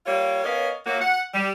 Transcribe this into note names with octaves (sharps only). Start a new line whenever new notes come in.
G3 A#3 F4 C#5
B3 C#4 A#4 C#5 D#5 F5
F#2 A#3 F#4
F#5
G3